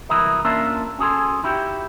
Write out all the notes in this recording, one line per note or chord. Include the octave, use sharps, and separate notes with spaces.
C2 E3 F#3 E4 A#4 D#5
A#3 C#4 D4 F4 A#4 E5
C#4 F#4 G#4 A4 G#5 C6
D#4 E4 F#4 G4